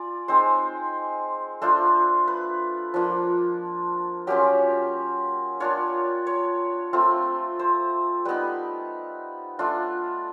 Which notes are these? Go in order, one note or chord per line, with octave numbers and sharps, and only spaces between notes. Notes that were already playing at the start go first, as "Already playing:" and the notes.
Already playing: F4 D5 G#5
G#3 C4 D#4 C5
A3 D4 F4 C5
B4
F3 A#3 D4 F4
F#3 A#3 C#4 F4 G4
A#3 D4 F4 C#5
C#5
A3 C4 F4
C5
G3 B3 D#4 B4
A3 D4 F4